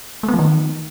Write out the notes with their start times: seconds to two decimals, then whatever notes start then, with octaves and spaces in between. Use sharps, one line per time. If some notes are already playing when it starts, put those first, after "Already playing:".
0.23 A3
0.28 B3
0.34 F3
0.39 D#3